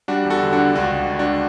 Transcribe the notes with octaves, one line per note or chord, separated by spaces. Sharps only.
G3 D4 F#4
E2
F#4 A4
D3
D4 F#4
D3
C#2 D4 F#4
C#2
C#2
D4 F#4